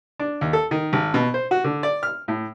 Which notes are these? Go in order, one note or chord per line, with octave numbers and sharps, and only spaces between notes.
D4
D#2
A4
D#3
G#1
B2
C5
F#4
D3
D5
F6
A2